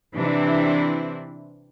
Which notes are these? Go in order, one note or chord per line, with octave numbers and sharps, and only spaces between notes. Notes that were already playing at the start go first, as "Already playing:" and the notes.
C3 E3 C4 D4 E4